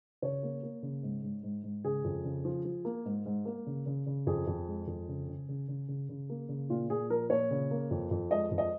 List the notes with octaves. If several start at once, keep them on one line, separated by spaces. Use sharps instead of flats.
C#3 C#5
A#3
A#3
C#3
G#2
G#2
G#2
G#2
C#3 G#4
F2
C#3
F3
F3
A#3
G#2
G#2
A#3
C#3
C#3
C#3
F2 G#4
F2
G#3
F2
C#3
C#3
C#3
C#3
C#3
C#3
A#3
C#3
A#2 F4
A#2 G#4
F3 A#4
A#2 C#5
C#3
A#3
F2
F2
G#3 D#5
F2
D#5